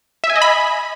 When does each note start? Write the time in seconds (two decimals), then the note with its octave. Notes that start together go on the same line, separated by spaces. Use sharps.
0.24 E5
0.30 G#5
0.36 D#5
0.42 B5